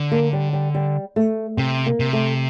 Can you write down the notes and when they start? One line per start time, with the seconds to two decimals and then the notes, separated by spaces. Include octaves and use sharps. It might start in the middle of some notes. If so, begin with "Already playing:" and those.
Already playing: D3
0.12 A#3
0.33 G3
0.53 G3
0.75 G3
1.16 A3
1.57 C3 C4
1.86 A#3
2.00 C3
2.13 A3